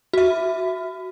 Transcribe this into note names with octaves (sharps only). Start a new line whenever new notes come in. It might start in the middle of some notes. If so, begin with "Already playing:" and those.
F#4 E5